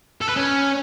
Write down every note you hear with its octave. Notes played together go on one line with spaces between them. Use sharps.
A4
B4
C#4